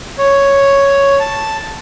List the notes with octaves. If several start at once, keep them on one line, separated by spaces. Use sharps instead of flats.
C#5
A5